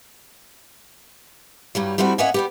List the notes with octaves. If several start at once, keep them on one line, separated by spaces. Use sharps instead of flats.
G2 F#3 G3
G3 A3 C4 E4 F#4
A#3 C#4 C#5 D#5 E5 F#5
G3 B3 G4